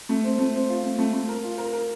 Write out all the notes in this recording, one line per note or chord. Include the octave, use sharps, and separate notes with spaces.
A3
C4
A3
C4
F4
A3
A3
A3
A#4
F4
A#4
A#4